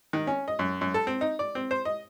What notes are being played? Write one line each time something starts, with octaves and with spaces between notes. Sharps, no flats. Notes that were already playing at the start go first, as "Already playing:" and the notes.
D#3
C#4
D#5
F#2
F#2
A4
C4
D#4
D5
C4
C5
D#5